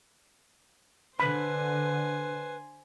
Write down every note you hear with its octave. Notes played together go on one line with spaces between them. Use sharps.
D3 B4 C5 G#5 B5